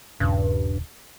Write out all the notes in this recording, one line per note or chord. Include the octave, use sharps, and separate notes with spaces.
D#1 G2 C#3